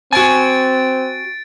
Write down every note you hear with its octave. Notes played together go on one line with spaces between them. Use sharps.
C4 F#4 G#5 A6 D7